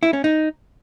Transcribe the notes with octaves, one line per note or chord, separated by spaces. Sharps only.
E4
C#4
D#4